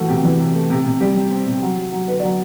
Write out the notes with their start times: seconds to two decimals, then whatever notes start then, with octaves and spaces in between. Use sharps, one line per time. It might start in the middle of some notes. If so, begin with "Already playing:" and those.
Already playing: A2 E3 A3 F#4
0.08 C3 G4
0.23 E3
0.39 C3
0.55 A3
0.70 C3 G4
0.85 C3
1.01 G3 G4
1.15 G3
1.31 C4
1.46 C3
1.62 F#3
1.77 F#3
1.93 F#3
2.08 D3 B4
2.19 F#3 D5